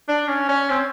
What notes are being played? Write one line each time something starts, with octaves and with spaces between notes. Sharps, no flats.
D4
C#4
C#4
C4